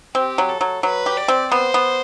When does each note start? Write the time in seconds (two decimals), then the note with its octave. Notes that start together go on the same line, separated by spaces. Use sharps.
0.15 C4 G4
0.38 F#3
0.49 A4
0.61 F#3
0.83 F#3 B4
1.06 G4
1.17 D5
1.28 C4
1.51 B3 C5
1.74 B3